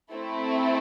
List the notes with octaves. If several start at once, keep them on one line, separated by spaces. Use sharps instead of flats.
A3 C4 E4